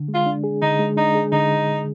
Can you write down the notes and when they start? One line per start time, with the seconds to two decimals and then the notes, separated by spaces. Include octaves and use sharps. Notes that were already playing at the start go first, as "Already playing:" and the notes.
Already playing: D3
0.08 G#3
0.14 F4
0.26 D4
0.44 G#4
0.62 D3 D#4
0.79 G#3
0.97 D4 D#4
1.15 G#4
1.32 D3 D#4